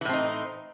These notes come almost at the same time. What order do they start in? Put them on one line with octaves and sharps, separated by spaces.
E3 A2 C4 D#4